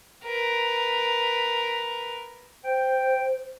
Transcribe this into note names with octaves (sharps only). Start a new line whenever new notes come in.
A#4 B4
C5 G5